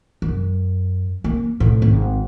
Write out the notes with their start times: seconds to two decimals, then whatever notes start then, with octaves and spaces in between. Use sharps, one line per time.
0.22 F#2
1.24 A#3
1.60 A2
1.82 G#1